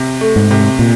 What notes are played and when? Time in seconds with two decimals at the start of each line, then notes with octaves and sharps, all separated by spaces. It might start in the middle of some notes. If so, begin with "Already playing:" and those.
Already playing: C3
0.21 A3
0.36 G#2
0.51 C3
0.79 A#2